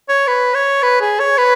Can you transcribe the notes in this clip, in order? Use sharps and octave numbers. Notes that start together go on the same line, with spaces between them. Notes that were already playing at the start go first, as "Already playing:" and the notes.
C#5
B4
C#5
B4
G#4
C#5
B4